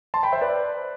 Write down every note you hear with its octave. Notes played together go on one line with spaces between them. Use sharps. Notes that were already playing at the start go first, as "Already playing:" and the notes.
A5 C6
G5 B5
C5 E5
B4 D5